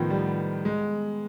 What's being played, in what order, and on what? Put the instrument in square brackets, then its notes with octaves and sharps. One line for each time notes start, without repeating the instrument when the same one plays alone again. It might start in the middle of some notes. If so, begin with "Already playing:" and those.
Already playing: [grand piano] A2 D#3 F3 [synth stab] B3
[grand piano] G3
G#3